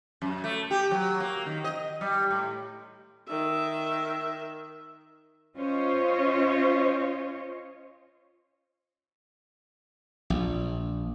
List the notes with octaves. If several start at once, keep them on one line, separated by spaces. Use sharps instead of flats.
F#2
A3
G4
F#3
A#3
D#3
D#5
G3
A2
D#3 E5
C#4 F4 C5 C#5 D#5
A#1